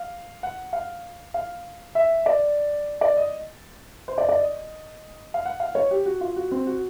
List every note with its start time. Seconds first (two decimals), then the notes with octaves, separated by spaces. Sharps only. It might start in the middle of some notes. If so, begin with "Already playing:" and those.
Already playing: F5
0.43 F#5
0.73 F5
1.34 F5
1.95 E5
2.26 D5
3.01 D5
3.17 D#5
4.08 C5
4.18 D5
4.29 D5
4.39 D#5
5.34 F5
5.45 F#5
5.60 F5
5.75 C#5
5.91 G4
6.06 F#4
6.21 F4
6.36 F#4
6.51 C4
6.67 F#4